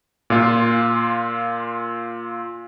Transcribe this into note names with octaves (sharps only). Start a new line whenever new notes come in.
A#2 F4